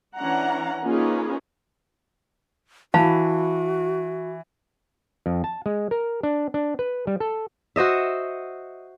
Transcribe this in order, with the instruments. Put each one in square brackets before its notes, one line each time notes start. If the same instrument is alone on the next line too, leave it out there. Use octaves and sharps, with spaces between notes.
[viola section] E3 C#4 D4 F#5 A#5
A#3 C#4 D#4 F4 G#4 B4
[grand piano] E3 [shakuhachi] F#4 [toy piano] F5 A5 B5
[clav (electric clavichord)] F2
A5
G#3
A#4
D4
D4
B4
G3
A4
[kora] F#4 C5 D#5 E5